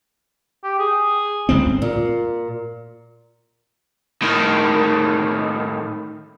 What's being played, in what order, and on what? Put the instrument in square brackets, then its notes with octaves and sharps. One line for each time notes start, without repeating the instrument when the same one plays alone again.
[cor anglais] G4
G#4
[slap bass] G1 C#2 C4
[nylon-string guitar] A#2
[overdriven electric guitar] A2 D#3